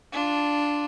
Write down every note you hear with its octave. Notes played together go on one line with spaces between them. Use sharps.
D4 F4